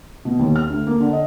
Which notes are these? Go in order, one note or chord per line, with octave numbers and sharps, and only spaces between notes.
B2
D#2
F6
D2
A#3
D3
D#5